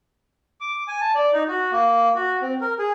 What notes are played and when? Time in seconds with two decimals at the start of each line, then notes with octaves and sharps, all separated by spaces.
0.61 D6
0.88 G#5
1.01 A5
1.15 D5
1.33 D#4
1.48 F#4
1.72 A#3
2.15 F#4
2.42 C4
2.61 A#4
2.79 G#4